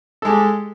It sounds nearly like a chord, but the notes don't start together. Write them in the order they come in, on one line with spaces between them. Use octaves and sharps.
A4 G#3 G4